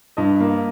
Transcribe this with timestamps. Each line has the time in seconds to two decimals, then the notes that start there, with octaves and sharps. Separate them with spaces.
0.17 G2 D#5
0.40 A#3